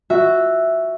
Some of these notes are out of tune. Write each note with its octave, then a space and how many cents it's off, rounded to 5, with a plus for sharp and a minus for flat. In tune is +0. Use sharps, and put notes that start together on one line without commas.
F#4 +0 E5 +0